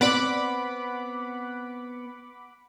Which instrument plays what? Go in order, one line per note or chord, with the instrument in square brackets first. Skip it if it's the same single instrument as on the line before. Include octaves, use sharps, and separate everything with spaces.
[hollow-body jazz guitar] B3 C4 D5 [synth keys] F#5 B5 D6